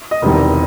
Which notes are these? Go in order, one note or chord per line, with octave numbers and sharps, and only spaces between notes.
D#5
E1 E2 C3 D#3 G3